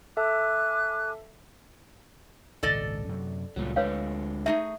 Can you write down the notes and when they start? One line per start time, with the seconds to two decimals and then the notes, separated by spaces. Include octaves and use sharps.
0.17 A4 E5 G#5 A5 D6 F#6
2.63 G#1 C#2 A#2 A4 D5 D#5
3.09 F#2 C3 F#3
3.56 C#2 A#2 F#3 G3
3.76 D2 D3 G#3 B4 C#5 F5
4.46 A3 D#4 G#4 E5